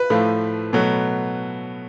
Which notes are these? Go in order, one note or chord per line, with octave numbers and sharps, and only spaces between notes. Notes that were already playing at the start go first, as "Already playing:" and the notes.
Already playing: B4
A2 F3 A3
B2 F#3 A3